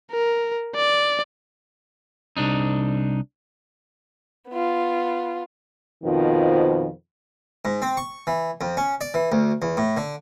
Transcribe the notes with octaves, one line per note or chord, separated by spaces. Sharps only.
A#4
D5
C2 D4 D#4
B3 F4
F2 B2 D#3 F3
G#2
C4
C#6
E3
F2
C#4
D5
E3
D2
E2
A2
D3